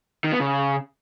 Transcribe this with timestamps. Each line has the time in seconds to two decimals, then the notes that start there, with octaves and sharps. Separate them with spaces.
0.24 D#3
0.32 B3
0.40 C#3